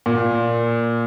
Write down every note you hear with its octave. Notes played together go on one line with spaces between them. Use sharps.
A#2